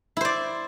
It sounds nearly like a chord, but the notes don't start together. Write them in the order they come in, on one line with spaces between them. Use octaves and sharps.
E4 C5 D5